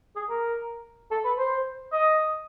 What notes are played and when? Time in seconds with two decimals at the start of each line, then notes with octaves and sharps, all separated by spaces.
0.16 G#4
0.29 A#4
1.11 A4
1.25 B4
1.38 C5
1.92 D#5